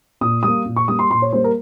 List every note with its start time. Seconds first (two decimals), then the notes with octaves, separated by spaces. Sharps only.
0.21 A#2 D#6
0.43 G3 A#3 D#6
0.66 A#2
0.76 C#6
0.88 G3 A#3 D#6
0.99 C6
1.10 A#2 C6
1.22 C#5
1.33 G3 A#3 C5
1.44 A#4